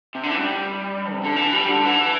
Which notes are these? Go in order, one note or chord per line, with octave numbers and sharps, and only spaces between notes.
C3
D3
E3
G3
C3
D3
E3
G3
D3
E3